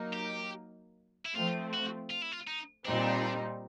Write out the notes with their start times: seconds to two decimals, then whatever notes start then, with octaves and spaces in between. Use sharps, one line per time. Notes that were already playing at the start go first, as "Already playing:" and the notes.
Already playing: F#3 A#3 D#4
0.13 G4
1.26 E4
1.35 F3 A3 C4 F4
1.73 F#4
2.10 F4
2.22 E4
2.32 F4
2.47 D#4
2.85 A#2 G3 C4 D4 D#4